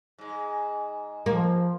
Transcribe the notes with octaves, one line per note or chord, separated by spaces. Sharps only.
G#2 G#3
F3 A#3